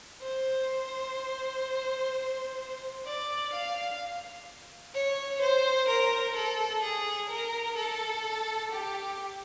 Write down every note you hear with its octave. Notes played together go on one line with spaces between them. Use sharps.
C5
D5
F5
C#5
C5
A#4
A4
G#4
A#4
A4
G4